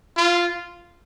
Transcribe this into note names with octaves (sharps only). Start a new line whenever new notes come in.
F4